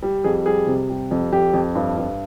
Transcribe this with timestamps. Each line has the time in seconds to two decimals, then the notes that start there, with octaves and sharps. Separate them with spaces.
0.03 G3
0.24 F2 G#4
0.46 G3 G#4
0.67 C3
0.90 G3
1.11 F2
1.33 F2 G4
1.54 F2
1.75 G2
1.97 G2